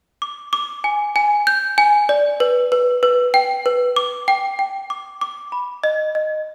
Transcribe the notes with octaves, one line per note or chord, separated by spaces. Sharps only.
D6
D6
G#5
G#5
G6
G#5
D5
B4
B4
B4
G5
B4
D6
G5
G5
D6
D6
B5
D#5
D#5